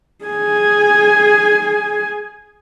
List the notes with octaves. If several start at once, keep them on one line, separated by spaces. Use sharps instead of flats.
G#4 G#5